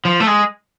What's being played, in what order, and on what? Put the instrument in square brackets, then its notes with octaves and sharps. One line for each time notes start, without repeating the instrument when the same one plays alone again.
[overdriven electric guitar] F3
A3
G#3